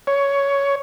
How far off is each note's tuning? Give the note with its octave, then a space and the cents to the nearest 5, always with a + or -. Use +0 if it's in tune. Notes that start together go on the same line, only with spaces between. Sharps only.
C#5 +10